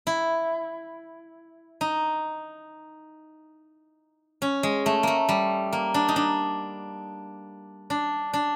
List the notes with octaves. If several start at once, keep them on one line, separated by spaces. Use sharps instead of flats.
E4
D#4
C#4
G#3
A3
A3 A#3
G3
A#3
D4
D#4
D4
D4
D4